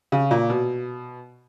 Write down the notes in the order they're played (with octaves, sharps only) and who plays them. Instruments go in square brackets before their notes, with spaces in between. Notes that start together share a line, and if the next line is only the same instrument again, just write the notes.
[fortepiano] C#3
A#2
B2